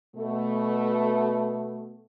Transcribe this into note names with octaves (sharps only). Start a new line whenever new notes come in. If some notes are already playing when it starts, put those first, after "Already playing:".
B2 A3